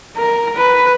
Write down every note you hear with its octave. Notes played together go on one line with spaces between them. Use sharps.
A#4
B4